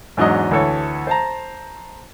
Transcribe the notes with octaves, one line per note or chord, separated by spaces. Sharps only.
E2 G#2 F#3 D4 D#5
D2 E3 A4 C#5
C5 A5 A#5